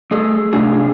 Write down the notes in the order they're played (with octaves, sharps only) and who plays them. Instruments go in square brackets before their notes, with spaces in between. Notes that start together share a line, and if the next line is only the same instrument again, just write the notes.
[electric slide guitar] A3 G#4 A4
G#2 C3 A3 D4 F4 G#4